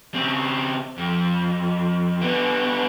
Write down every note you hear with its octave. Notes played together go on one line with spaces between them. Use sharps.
C#3 C4
F2
D3 B3